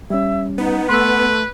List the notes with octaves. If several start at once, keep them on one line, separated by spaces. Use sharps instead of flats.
G3 C#4 E5
B3 D#4
A3 B4 C6 E6